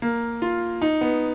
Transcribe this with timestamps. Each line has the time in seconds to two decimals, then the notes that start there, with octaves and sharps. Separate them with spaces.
0.02 A#3
0.42 F4
0.82 D#4
1.01 B3